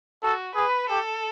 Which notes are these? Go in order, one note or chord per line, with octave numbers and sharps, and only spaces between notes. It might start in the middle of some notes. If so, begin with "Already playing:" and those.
F#4 A4
G#4 B4
G4 A4